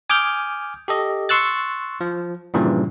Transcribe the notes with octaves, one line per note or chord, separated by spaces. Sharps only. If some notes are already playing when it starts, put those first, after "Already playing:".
G#5 D6 D#6 F6 G6
G4 A4 D#5
C6 C#6 E6 F#6 A6
F3
G2 A#2 C#3 E3 F3